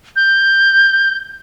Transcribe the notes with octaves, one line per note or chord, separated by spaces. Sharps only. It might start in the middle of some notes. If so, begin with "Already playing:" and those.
G6